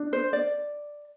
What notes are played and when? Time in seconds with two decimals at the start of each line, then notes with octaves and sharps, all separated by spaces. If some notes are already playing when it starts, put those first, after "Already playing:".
Already playing: D4
0.13 C5
0.33 D5